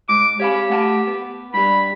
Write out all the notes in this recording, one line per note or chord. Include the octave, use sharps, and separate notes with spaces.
G#2 D6
G4 C#5 F5 B5
A3 F#5 A5
B3
G2 G3 B5